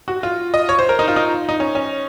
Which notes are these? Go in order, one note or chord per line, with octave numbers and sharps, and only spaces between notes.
F#4
F4
D#5
C#5
C5
A#4
D#4
F4
D#4
D#4
C#4
C#4